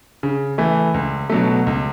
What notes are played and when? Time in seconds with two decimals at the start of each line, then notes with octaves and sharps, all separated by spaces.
0.23 C#3
0.58 E3 A3
0.94 C#2
1.30 B2 F#3 A3
1.67 C#2